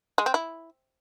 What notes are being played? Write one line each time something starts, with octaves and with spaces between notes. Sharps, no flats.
G#3
C4
E4